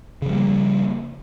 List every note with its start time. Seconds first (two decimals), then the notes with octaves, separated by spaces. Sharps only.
0.22 C#3
0.26 F3
0.30 G3
0.34 A#3